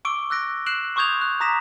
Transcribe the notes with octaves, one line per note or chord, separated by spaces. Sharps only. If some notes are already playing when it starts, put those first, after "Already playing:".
C#6 D6 E6 D7 G7
E6 F#6 A#6 D7
F#6 C7 D7 E7 F#7
C6 C#6 D#6 G6 G#6 F7
F#6
A#5 D6 D#6 A#6 B6 E7